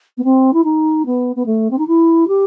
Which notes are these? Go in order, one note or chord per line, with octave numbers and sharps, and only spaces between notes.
B3
C4
E4
D#4
B3
B3
A3
C4
D#4
E4
G4